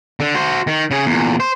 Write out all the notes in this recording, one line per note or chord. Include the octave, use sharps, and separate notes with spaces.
D3
F#4 C5
D#3
C#3 G#4
E2 A#2
C5